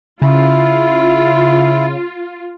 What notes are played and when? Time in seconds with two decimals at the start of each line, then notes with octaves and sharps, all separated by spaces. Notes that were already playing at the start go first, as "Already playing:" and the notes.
0.22 C#3 E4 F4